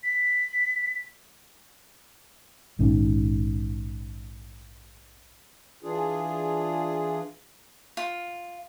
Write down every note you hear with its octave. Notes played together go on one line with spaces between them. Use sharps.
B6
A#1 G#2 D#3 C#4
E3 D4 F4 G#4
F4